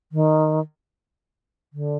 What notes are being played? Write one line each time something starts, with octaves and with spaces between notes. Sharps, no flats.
D#3
D3